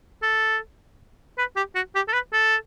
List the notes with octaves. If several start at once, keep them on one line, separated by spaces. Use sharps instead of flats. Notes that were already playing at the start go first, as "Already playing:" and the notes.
A4
B4
G4
F#4
G4
A4
B4
A4